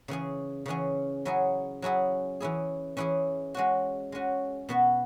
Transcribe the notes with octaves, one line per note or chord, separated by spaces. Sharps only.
C#3 E3 C#4 G#4
C#3 E3 C#4 G#4
F#3 C#4 E4 G#4
F#3 C#4 E4 G#4
E3 C#4 E4 G#4
E3 C#4 E4 G#4
G#3 C#4 F#4
G#3 C#4 F#4
B2 B3 F#4